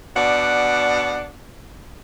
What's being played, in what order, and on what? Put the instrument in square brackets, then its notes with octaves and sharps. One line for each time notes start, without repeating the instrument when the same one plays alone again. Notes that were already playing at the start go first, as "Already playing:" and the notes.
[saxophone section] B2 D4 D5 F#5